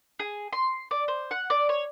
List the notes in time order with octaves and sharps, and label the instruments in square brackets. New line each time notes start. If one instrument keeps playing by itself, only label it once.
[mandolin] G#4
C6
D5
C5
F#5
D5
C#5